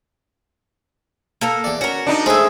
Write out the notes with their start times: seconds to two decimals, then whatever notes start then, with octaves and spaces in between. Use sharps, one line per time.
1.41 A#3 A4 A#4
1.64 E2 D5
1.81 C#4 F#4 A#4
2.07 D4 D#4
2.26 G#3 A3 C4 C#4 G#4 E5